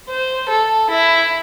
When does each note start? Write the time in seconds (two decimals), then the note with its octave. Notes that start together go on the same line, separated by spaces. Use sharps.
0.09 C5
0.49 A4
0.90 E4